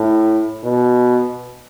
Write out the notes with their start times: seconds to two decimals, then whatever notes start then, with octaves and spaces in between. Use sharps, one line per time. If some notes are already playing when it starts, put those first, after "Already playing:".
Already playing: A2
0.64 B2